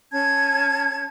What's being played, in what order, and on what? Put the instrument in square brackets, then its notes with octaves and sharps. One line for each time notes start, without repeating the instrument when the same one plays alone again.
[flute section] C#4 A5 G#6